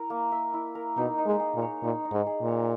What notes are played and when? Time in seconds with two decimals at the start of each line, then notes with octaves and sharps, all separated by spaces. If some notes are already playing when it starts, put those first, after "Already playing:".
Already playing: E4 A#4
0.10 A#3
0.32 E5
0.54 E4
0.75 A#4
0.97 B2 D#4
1.18 D#4
1.26 G#3
1.40 G#4
1.55 A#2
1.62 C#5
1.83 A#2 D#4
2.05 D#4
2.12 G#2
2.27 G#4
2.41 A#2
2.48 C#5